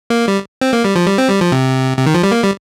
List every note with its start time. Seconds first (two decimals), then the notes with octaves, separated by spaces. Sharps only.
0.10 A#3
0.28 G3
0.61 C4
0.73 A#3
0.84 G3
0.96 F3
1.07 G3
1.18 C4
1.29 G3
1.41 F3
1.52 C3
1.97 C3
2.06 D#3
2.15 F3
2.23 G3
2.32 A#3
2.43 G3